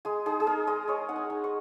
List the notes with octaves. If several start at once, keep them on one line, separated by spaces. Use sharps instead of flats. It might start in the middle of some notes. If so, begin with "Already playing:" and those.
G#3 G#4
D#4 G#4
G#4
D#4 A#4
G#3 D#5
G#3 C#5
D#4 F#5
G#5
D#4
C#6